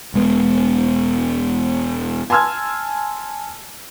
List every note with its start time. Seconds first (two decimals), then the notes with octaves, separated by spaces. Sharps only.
0.14 E1 G#3 B3
2.30 G#5 A5 C6 E6 F6 G#6